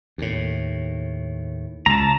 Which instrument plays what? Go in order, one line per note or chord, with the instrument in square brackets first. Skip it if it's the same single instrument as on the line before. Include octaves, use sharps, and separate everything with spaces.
[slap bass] D#2 A2
[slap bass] C#2 [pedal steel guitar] A5 A#5